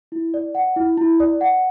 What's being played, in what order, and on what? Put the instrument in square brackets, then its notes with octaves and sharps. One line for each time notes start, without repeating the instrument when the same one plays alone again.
[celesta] E4
D5
F#5
E4
E4
D5
F#5